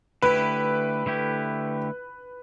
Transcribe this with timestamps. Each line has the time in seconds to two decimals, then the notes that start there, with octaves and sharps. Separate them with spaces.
0.22 D3 A3 E4 G4 B4
1.06 D3 A3 E4 G4